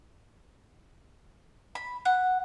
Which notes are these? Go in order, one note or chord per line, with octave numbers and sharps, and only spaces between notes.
B5
F#5